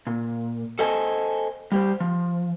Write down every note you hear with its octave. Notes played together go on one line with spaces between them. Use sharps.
A#2
A4 C5 D#5 G#5 A5
G3 G4 C5
F3